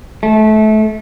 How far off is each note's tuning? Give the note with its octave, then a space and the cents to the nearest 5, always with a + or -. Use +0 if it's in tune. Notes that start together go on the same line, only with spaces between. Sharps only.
A3 -25